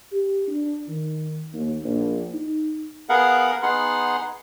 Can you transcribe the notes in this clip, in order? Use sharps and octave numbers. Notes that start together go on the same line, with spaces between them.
G4
D4
D#3
D#2
A#1
D#4
B3 G#4 A#4 F5 F#5
B3 D#4 G#4 F#5 C6